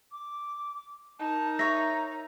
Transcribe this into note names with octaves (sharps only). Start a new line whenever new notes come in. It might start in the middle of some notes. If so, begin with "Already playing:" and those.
D6
D#4 A#4 A5
C#5 E5 A#5 A#6